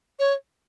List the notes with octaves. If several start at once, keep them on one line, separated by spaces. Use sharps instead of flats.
C#5